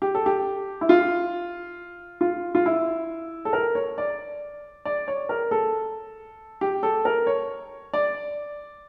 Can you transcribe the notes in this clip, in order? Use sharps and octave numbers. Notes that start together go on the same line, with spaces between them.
G4
A4
G4
E4
F4
F4
F4
E4
A4
A#4
C#5
D5
D5
C#5
A#4
A4
G4
A4
A#4
C#5
D5